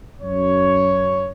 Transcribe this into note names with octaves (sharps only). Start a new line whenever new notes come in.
F#2 C#5